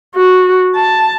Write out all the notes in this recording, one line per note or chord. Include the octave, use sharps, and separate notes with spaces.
F#4
A5